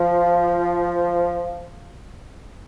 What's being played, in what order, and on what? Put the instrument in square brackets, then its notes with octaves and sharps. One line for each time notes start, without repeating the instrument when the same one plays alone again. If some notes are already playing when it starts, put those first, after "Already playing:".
Already playing: [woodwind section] F3